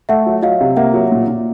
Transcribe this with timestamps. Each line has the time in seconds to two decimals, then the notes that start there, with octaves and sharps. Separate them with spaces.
0.09 A3 E5 F#5
0.26 F#3
0.43 F#3 D#5 F5
0.61 C3
0.77 A#3 E5 F#5
0.94 F#3
1.12 A#2
1.28 A#2